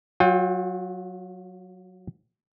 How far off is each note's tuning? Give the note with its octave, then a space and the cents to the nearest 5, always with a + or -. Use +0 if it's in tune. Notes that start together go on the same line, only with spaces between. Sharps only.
F#3 +0 F4 +40 G5 +15